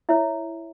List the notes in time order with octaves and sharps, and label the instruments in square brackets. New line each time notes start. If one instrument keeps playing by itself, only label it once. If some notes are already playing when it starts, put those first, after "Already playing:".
[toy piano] E4 C#5 E5